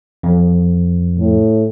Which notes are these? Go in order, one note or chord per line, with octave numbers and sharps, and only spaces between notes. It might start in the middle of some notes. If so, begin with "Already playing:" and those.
F2
A2